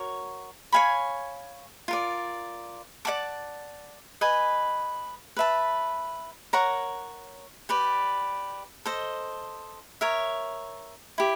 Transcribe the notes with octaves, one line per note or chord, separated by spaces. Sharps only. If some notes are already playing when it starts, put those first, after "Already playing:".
Already playing: F#4 A#4 C#5
C#5 F5 G#5 B5
F4 A#4 D5
D5 F#5 A5 D6
B4 D#5 G#5
B4 E5 A5
A#4 C#5 F#5 A#5
G4 B4 D5
A4 C5 D#5
A#4 C#5 E5
E4 G4